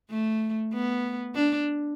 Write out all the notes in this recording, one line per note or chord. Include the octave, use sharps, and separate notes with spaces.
A3
B3
D4